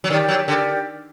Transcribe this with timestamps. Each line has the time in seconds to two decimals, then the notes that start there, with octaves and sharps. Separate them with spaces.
0.04 F#3
0.10 D#3 G4 A#4 D5
0.28 F#3
0.48 D3 G4 A#4 D5